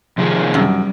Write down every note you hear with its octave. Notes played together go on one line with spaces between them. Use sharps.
C3 D#3 F3 G#4
F#2 G3